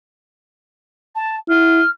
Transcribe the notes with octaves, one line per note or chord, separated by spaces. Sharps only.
A5
E4 F6